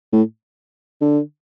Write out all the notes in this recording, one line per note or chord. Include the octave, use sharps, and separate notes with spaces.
A2
D3